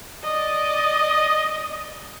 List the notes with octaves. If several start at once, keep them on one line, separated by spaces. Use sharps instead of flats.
D5 D#5